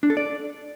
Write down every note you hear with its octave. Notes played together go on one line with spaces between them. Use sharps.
D4
A4
D5